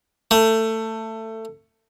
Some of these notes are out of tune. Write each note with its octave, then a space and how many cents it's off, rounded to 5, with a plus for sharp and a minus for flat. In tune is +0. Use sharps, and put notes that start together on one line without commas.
A3 +20